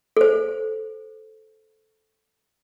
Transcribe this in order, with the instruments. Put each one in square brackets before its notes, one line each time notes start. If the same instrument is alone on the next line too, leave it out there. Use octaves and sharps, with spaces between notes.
[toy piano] A4 C5